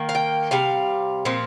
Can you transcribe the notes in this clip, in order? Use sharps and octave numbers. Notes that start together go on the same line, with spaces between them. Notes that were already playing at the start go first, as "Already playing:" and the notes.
Already playing: D#3 A#3
F5
G5
C3 G3 F5
A#2 F3 C4